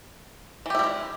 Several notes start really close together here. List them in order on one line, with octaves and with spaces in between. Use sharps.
E3 G4 E4 G3 G#3